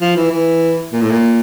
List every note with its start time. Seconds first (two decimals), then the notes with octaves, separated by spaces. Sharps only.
0.01 F3
0.16 E3
0.32 E3
0.93 A#2
1.02 A2
1.11 A#2